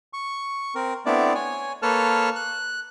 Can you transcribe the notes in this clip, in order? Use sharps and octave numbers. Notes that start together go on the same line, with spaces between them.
C#6
C4 A#4
A3 B3 C4 D4 E4 D5
C#5 G#5
A#3 A4 B4 C#5 A5 F6
F#6